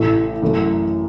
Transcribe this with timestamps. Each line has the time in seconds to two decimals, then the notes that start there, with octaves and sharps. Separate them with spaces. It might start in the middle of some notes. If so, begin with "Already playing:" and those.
Already playing: A1 A2 E3 A3
0.42 F#2 E3 A3